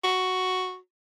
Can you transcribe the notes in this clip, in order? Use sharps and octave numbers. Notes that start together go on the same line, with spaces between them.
F#4